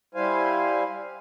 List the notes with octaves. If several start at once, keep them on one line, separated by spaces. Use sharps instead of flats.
G3 E4 C5 F5 G#5